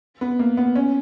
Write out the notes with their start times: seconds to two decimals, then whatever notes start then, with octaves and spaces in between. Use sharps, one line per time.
0.21 B3
0.39 A#3
0.57 B3
0.76 C#4